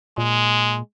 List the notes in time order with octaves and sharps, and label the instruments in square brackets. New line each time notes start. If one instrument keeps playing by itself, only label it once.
[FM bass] A#2 [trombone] G#3